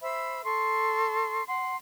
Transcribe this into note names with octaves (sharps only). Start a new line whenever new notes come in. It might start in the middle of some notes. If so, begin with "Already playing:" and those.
C5 E5 B5 E6
A4 C6 C#6
F#5 C6